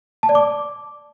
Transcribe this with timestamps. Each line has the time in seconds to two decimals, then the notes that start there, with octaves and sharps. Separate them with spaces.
0.23 A5
0.29 D5
0.35 D6